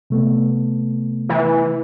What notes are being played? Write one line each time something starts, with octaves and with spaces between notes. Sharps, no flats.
C3 A3 B3
E3